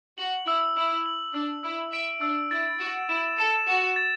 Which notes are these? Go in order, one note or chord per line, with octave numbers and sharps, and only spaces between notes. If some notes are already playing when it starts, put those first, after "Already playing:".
F#4 F#7
E4 E6
E4 E6
F#7
D4 E6
E4 E6
E5 D7
D4 E6
E4 A6
F#4 E7
E4 E7
A4 E7
F#4 E7
A6